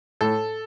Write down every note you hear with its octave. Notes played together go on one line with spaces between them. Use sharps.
A2 A4